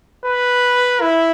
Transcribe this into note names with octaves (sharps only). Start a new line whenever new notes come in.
B4
E4